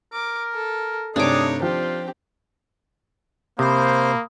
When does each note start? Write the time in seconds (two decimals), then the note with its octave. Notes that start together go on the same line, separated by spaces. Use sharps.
0.13 A#4 D6
0.53 A4
1.16 G2 C3 A3 D4 D#4 G#4 C#5 D6
1.62 F3 C4 F4 G4
3.59 C3 A#3 C5 B5 D#6